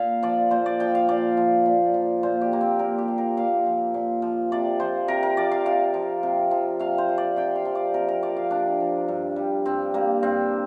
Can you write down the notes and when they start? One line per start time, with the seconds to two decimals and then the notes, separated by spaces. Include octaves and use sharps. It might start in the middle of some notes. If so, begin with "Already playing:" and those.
Already playing: A#2 F5
0.23 F3 D5
0.51 A#2 C5
0.66 D5
0.80 F3 G5
0.95 F5
1.09 A#2 D5
1.37 F3
1.66 A#2
1.94 F3
2.23 A#2 C5
2.41 G4
2.52 F3 A#3
2.61 C4
2.79 A#2 A#4
2.98 G4
3.08 F3
3.18 A#4
3.37 A#2 F5
3.66 F3
3.94 A#2
4.22 F3
4.52 C3 D5
4.80 F3 C5
5.08 C3 A#4
5.23 A#4
5.37 F3 D5
5.52 F5
5.66 C3 F5
5.94 F3
6.23 C3
6.51 F3
6.79 C3 F5
6.98 C5
7.09 F3
7.18 D5
7.36 C3 G5
7.56 F5
7.65 F3
7.75 D5
7.94 C3 A#4
8.08 A#4
8.23 F3 D5
8.37 F5
8.51 C3 D4
8.80 F3
9.08 G2
9.36 G3
9.66 G2 C4
9.94 G3 A#3
10.23 G2 C4